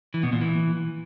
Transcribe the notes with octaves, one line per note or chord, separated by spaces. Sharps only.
E3
B2
A#2
E3